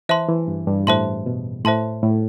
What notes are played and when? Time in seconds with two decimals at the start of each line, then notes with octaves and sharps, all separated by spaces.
0.09 E3 C5 E5 A5 C6
0.28 E3
0.48 G2
0.67 G2
0.87 A2 C5 E5 A5 C6
1.26 B2
1.65 A2 C5 E5 A5 C6
2.03 A2